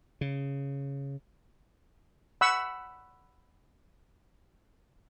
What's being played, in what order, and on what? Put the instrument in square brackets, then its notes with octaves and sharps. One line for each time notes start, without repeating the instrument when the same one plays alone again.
[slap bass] C#3
[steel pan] F#5 B5 C#6 E6